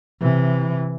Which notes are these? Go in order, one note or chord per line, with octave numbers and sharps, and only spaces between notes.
C3 E3